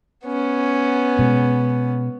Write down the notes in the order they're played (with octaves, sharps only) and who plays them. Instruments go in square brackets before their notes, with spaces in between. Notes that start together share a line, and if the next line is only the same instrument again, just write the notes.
[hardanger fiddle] B3 C#4
[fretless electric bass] B2 G#3